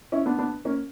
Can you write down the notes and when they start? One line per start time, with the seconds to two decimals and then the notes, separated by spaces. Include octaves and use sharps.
0.12 C#4 E4
0.26 B3 D4
0.38 B3 D4
0.65 A#3 C#4